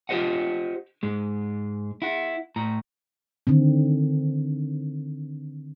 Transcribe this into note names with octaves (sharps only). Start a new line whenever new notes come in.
F4 G4 C5 D#5 F#5
G#2 G#3
E4 F#5
A2 A#5
D3 D#3 C4